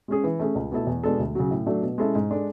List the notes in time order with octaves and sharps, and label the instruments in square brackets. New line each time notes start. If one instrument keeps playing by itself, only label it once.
[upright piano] G#3 C#4 G#4
E3
A3 C#4 G#4
C#2
B2 A3 E4 A4
E2
B2 G#3 D4 A4
D2
C#3 F#3
A2
F#3 A3 D4
B2
G#3 C#4 E4 A4
G#2
G#3 D4 A4